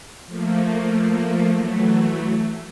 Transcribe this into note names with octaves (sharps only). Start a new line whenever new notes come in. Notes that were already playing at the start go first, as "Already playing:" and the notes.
F3 A3 A#3
E3 F#3 A3